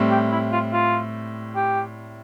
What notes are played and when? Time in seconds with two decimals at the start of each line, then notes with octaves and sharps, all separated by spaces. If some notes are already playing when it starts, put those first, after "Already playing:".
Already playing: A2 G3 C4
0.11 G4
0.31 E4
0.52 F4
0.73 F4
1.56 G4